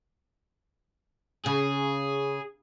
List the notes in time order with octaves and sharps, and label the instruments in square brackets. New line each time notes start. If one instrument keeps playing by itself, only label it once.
[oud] C#3 [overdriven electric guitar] G#4